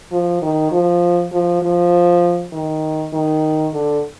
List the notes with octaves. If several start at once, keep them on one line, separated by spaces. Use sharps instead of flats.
F3
D#3
F3
F3
F3
D#3
D#3
D3